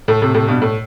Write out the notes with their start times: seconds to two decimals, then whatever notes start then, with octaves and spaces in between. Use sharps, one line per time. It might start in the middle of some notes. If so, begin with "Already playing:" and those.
0.08 A2
0.22 A2 C3
0.34 A2 C3
0.48 G2 B2
0.62 A2